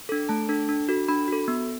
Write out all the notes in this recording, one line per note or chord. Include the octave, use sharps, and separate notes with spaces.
D4 A4
A3 A5
D4 A4
D4
F#4 A4
D4 B5
F#4 A4
B3